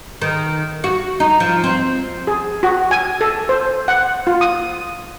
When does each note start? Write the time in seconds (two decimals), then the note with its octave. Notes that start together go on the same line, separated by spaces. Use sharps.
0.22 D#3
0.84 F#4
1.20 D#4
1.40 F3
1.64 C4
2.27 G#4
2.63 F#4
2.91 G#5
3.21 A4
3.49 C5
3.88 F#5
4.27 F4
4.41 D#6